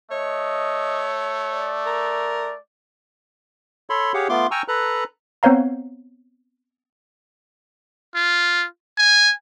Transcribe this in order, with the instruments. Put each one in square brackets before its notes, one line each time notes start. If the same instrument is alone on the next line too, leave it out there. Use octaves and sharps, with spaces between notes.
[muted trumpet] A3 [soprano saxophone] C#5 [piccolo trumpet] D#5
[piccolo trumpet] D5
[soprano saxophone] A#4
[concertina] A4 C#5 B5 C6
G4 G#4 C#5 F5 F#5
A3 B3 F4 C6 D6
G5 G#5 A#5 C#6 E6 F6
A4 B4 A#5 F#6
[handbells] B3 C4 C5 C#5 F5 A#5
[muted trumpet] F4
G#5